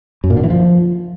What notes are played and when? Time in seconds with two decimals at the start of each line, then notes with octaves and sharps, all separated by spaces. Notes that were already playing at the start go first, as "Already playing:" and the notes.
0.24 F#2
0.30 A#2
0.37 D3
0.44 E3
0.50 F3